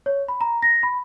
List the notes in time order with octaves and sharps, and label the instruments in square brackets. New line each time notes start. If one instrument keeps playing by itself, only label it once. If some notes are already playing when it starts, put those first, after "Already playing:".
[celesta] C#5
B5
A#5
A#6
B5